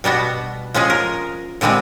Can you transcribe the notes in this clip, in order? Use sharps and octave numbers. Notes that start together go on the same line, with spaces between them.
B2 G3 B3 F#4
F3 G#3 C#4 G#4
A#4
A#2 D3 G3 G#3 C4